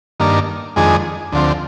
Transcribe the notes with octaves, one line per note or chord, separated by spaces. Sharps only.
G2 D#3 A#3 D4
F2 D#3 G#3 D4 G#4
D2 D3 F3 C4